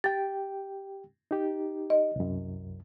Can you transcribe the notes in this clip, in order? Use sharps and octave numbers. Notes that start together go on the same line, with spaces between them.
G4 G5 A6
D#4 G4
D#5
C2 F#2